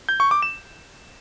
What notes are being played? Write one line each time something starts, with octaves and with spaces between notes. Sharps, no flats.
G6
C#6
D6
E7